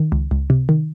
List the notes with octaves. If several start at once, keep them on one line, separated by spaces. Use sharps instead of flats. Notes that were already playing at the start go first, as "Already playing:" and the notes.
Already playing: D#3
C#2
C#2
C3
D#3